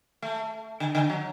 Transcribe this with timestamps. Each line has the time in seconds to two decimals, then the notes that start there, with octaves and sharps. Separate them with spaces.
0.22 A3
0.80 D3
0.95 D3
1.10 F#3